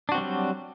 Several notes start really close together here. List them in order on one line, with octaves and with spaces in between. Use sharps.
D4 F#4 C4 G3 F#3